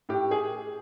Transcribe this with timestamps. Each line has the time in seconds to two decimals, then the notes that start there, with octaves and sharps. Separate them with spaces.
0.09 A2 G4
0.31 G#4